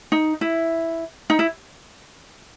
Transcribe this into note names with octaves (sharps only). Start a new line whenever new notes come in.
D#4
E4
D#4
E4